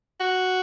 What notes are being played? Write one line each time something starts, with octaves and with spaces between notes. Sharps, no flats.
F#4